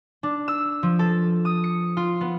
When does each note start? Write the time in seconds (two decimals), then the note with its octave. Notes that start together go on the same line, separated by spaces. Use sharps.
0.23 D4
0.48 E6
0.83 F3
0.99 A4
1.45 D#6
1.64 C#7
1.97 F4
2.21 B3